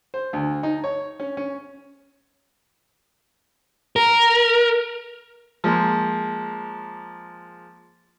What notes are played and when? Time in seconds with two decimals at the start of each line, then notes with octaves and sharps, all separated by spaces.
0.14 C5
0.33 D2
0.63 D#4
0.84 C#5
1.20 C#4
1.37 C#4
3.96 A#4
5.64 F3 G#3 A#3